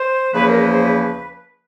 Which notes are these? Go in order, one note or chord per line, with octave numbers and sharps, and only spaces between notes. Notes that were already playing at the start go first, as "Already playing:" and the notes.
Already playing: C5
E2 C#3 F3 A#3 B4
A#4
B4
C5
B4